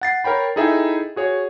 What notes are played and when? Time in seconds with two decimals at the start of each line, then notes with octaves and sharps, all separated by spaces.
0.01 F#5 A6 C7
0.24 A#4 C#5 G5 B5
0.56 D#4 E4 G#4 A4 E5 G5
1.16 F#4 G#4 C#5